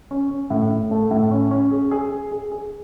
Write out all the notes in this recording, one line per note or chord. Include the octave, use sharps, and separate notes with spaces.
C#4
C#4
A2
A2
A3
A2
C#4
C#4
G#4
G#4
G#4
G#4
G#4